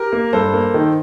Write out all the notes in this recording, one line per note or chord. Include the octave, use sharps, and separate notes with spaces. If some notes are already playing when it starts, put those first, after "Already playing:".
Already playing: G4 A#4
A#3
G2 A4 C5
A#3
D#3